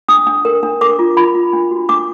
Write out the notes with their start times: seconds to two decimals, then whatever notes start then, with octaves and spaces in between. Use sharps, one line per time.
0.08 D4 D#6
0.27 D4
0.45 A#4
0.63 D4
0.81 A#4 D6
0.99 F4
1.17 F4 B5
1.35 F4
1.53 D4
1.71 F#4
1.89 D4 D6